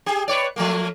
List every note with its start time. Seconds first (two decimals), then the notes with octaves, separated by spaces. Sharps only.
0.06 G4 G#4
0.28 B4 C#5 D5
0.56 F3 A3 A#3